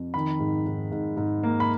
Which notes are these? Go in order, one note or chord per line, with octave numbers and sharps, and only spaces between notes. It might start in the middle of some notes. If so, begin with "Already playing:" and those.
Already playing: F2
D#3 B5
G#2
G#2
G#2
G#2
A#3
B5